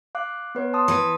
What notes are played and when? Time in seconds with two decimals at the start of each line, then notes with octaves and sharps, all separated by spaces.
0.15 F5 D6 F#6
0.55 B3 B4 C#5
0.74 A5 C6 D#6
0.88 E3 B4